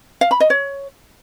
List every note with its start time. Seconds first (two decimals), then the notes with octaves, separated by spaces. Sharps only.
0.21 F5
0.31 B5
0.40 D#5
0.50 C#5